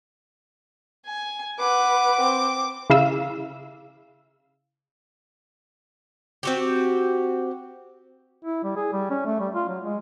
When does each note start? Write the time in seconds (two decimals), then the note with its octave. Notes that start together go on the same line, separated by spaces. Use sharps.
1.06 G#5
1.59 B4 F#5 D6
2.20 C4
2.90 C#3 E4 F5 E6
6.43 C4 F#4 G4
8.45 E4
8.64 G3
8.76 G#4
8.93 G3
9.10 C#4
9.26 A3
9.40 G3
9.55 F4
9.68 F#3
9.83 G#3